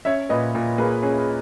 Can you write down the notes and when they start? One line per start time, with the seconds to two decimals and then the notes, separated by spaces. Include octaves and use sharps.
0.05 C#4 C#5 E5
0.29 A#2 B4 D#5
0.55 A#2
0.78 A#3 G#4 B4
1.03 C#4 G#4
1.18 G#4